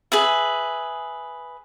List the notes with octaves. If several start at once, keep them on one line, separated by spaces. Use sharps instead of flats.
G#4 B4 E5